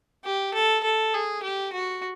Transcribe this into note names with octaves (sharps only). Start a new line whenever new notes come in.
G4
A4
A4
G#4
G4
F#4